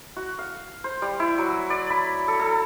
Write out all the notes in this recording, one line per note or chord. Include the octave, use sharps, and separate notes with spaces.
F#4
F5
C5
G3
E4
F#3
D5
B5
A4
A4